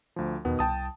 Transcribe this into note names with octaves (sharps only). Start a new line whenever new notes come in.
D2 F3
E2 B2 D#3 B3
C2 G5 A5 D#6